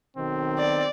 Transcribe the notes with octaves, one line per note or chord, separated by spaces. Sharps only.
B1 B2 D#3 C4
D5